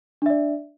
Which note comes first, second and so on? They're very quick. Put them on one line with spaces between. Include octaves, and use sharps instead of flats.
D4 E5 D5